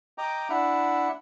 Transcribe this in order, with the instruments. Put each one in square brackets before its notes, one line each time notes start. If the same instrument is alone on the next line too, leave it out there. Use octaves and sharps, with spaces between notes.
[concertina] D#5 G5 A#5 D6
D4 E4 E5 F#5